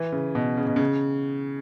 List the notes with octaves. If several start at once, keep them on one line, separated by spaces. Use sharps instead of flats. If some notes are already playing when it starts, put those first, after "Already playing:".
Already playing: E3
C#3
B2
C#3
B2
C#3